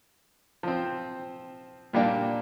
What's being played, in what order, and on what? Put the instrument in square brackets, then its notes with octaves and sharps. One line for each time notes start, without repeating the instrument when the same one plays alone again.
[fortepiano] F3 C4
A#2 G3 A#3 D4